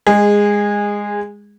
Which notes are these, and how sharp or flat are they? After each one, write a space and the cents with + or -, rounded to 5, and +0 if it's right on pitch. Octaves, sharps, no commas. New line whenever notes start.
G#3 -10 G#4 -20